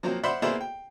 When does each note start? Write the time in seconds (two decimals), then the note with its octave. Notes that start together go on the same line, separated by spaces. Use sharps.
0.03 F3 F#3 A#3 C4
0.23 C5 D5 E5 F#5 B5 C6
0.42 A#3 B3 E4 G#4 C5 D5
0.60 G5